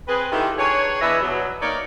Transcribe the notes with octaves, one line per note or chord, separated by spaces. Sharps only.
C4 G#4 B4
D3 D#3 E4 F4 G4 A4
D4 G#4 B4 C#5
E3 B3 D4 B4 D#5 E5
B2 F#3
A#3 D#4 A#4 C#5 D5